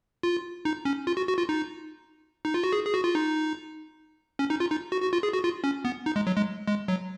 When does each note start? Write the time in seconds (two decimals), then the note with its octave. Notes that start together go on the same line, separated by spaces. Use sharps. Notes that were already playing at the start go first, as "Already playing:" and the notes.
0.23 F4
0.65 D#4
0.85 C#4
1.07 F4
1.17 F#4
1.28 F#4
1.38 F4
1.49 D#4
2.45 D#4
2.54 F4
2.64 F#4
2.73 G#4
2.86 G#4
2.94 F#4
3.04 F4
3.15 D#4
4.39 C#4
4.50 D#4
4.60 F4
4.71 D#4
4.92 F#4
5.02 F#4
5.13 F4
5.23 G#4
5.33 F#4
5.44 F4
5.64 C#4
5.85 B3
6.06 D#4
6.16 G#3
6.27 F#3
6.37 G#3
6.68 G#3
6.88 F#3